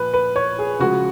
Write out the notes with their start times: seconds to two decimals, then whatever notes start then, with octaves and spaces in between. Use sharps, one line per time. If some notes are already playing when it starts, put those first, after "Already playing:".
Already playing: A#2 F3 B4
0.14 B4
0.36 C#5
0.59 G#4
0.79 C#3 F3 G#3 F#4